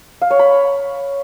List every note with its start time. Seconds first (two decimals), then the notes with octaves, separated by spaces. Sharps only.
0.22 F5
0.30 C#5
0.39 B5